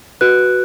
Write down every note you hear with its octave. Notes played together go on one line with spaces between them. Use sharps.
F#4 B4 F#6